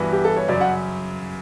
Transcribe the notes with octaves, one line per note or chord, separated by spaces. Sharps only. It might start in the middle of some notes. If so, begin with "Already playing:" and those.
Already playing: G2 E3 B3 F#4
G4
A4
C#5
F#2 C#3 F#3 D5
F#5